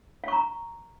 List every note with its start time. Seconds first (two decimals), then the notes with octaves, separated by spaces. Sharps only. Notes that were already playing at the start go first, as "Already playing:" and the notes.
0.24 F5
0.28 C#6
0.33 A#5